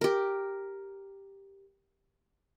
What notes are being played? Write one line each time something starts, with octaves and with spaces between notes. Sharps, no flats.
G4 A#4